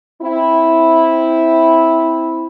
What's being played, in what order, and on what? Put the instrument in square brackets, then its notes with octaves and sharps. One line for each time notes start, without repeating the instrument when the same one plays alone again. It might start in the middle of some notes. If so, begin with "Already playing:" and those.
[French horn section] C4 E4